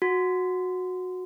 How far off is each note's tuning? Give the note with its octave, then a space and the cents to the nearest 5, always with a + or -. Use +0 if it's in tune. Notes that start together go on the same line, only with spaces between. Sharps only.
F#4 -15